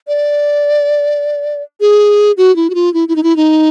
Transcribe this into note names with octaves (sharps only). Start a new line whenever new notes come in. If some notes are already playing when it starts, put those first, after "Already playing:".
D5
G#4
F#4
E4
F#4
F4
E4
E4
D#4
E4
D#4